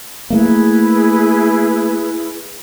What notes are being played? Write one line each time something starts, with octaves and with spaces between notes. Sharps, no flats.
A3 A#3 E4 G#4 B4